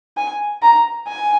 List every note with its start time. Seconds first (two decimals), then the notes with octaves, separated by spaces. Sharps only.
0.17 G#5
0.62 A#5
1.07 G#5